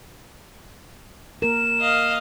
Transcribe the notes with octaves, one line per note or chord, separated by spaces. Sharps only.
A#3 A#4 E7
D#5 F5